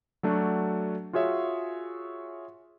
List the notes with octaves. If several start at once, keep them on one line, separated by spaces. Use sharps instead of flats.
F#3 A3 D4 F#4
F4 F#4 G#4 C#5 E5